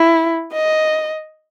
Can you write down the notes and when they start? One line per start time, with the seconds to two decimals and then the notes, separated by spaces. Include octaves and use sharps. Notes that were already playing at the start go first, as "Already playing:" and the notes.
Already playing: E4
0.53 D#5